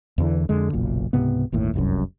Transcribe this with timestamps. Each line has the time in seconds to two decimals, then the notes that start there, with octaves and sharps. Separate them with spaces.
0.18 E2 D3 E3
0.49 F2 D3 G#3
0.73 F#1 B1 A#2
1.13 C#2 G#2 C3 B3
1.52 G1 D#2 A2
1.74 F1 C2 F#2